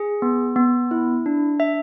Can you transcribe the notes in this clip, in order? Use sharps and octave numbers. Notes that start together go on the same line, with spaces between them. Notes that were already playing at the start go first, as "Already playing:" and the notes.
Already playing: G#4
B3
B3
E4
D4
E5